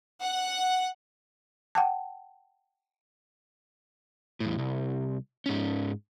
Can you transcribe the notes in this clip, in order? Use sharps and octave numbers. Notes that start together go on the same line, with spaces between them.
F#5
F#5 G5 A5
E2 A2
C2
G#2 C#4